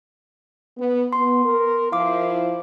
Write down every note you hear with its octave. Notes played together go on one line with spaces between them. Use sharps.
B3
B3 C6
A#4
F3 E4 F5 D6